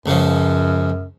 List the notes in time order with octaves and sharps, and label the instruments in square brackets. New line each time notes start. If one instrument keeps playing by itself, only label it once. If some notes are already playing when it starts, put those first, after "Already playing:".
[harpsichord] C#2 C#3 F3 [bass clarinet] F#2